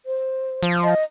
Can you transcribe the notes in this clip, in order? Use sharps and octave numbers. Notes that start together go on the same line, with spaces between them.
C5
F3
D#5